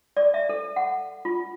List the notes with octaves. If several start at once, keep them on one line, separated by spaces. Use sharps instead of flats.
D5
E5
A4
F#5
F4